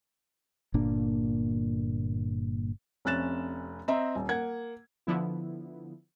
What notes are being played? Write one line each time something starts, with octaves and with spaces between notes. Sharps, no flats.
G1 A#2 A#3 D4
F1 C3 C#4 F#6 A6 E7
C4 C5 D#5 E5 A#5
D#1
A#3 F#5 G#6
D3 F3 B3 E4